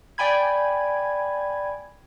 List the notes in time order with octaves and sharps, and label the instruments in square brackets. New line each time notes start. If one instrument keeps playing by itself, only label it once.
[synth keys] D5 G5 G#5 B5 G#6